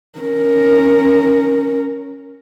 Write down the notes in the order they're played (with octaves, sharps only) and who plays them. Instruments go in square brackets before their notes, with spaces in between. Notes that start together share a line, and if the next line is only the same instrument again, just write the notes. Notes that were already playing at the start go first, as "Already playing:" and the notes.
[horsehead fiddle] C#4 A#4